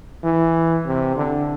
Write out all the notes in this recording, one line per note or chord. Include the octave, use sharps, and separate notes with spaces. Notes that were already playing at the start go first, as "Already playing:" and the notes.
E3
C3
D3